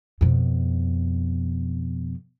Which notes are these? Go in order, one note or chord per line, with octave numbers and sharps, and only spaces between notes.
F2 B2